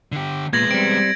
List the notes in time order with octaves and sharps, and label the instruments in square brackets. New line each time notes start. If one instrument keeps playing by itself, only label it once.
[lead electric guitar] D3 G4
[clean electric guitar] A#2 [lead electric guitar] G#3 B3 [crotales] G#6 A#6 F#7
[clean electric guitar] G3 C4 [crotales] D7